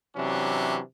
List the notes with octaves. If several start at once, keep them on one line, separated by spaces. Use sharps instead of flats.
C3 E3 F#3 C#4 D4